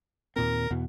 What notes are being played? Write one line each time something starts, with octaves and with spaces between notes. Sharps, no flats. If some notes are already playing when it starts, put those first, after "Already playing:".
D#2 A#2 C4 A#4
E2 B2 B3